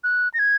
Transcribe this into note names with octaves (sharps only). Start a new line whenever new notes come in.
F#6
A#6
G#6